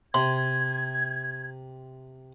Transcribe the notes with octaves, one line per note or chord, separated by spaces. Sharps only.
C3 C6 G#6